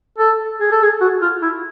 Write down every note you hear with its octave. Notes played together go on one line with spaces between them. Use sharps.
A4
G#4
A4
G#4
F#4
F4
E4